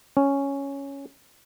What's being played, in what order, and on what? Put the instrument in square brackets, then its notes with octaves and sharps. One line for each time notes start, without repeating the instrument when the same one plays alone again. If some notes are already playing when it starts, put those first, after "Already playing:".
[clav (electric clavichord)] C#4